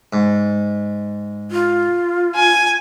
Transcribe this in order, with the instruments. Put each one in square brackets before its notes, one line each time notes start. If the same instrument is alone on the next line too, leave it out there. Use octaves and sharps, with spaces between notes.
[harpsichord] G#2
[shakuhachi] F4
[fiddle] G#5